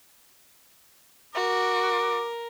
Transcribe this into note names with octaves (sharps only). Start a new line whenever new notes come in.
F#4 A#4 D6